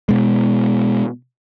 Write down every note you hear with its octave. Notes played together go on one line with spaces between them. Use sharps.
B2 G#3